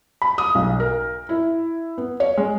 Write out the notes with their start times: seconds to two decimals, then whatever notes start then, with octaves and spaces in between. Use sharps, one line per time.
0.22 B5
0.38 D#6
0.55 B1
0.80 A#4
1.29 E4
1.98 B3
2.20 C#5
2.37 G#3